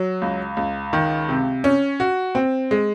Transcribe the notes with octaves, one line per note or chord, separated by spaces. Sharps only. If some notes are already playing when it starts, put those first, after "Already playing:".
Already playing: F#3
C#2
C#2
D#3
C3
C#4
F#4
C4
G#3